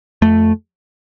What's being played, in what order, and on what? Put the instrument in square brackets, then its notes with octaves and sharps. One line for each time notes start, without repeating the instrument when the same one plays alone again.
[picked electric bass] F2 A3